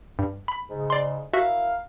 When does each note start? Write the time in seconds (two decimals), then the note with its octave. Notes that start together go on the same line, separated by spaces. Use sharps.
0.19 G2
0.48 B5
0.70 G#2 C#3
0.90 D5 C6
1.33 E4 F#4 A#4 E5 F5